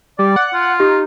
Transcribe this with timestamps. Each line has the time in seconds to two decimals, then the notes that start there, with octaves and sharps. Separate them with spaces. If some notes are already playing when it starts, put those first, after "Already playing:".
0.19 G3 D5
0.36 F#5
0.54 F4
0.80 D#4 G4